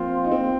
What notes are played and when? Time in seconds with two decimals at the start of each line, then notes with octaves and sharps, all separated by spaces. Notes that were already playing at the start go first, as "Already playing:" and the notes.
Already playing: F3 A#3 C4 F4
0.24 D#4
0.31 C4